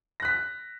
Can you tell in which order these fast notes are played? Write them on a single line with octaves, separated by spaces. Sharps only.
A#6 F#6 B6